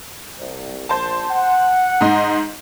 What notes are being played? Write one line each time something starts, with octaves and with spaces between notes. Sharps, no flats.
C2
A#1 C5 A5
F#5
G#2 D#5 C6